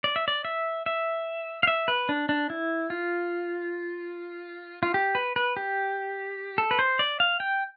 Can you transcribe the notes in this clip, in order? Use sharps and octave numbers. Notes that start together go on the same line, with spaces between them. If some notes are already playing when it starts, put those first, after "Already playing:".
D5
E5
D5
E5
E5
F5
E5
B4
D4
D4
E4
F4
F4
G4
B4
B4
G4
A4
B4
C5
D5
F5
G5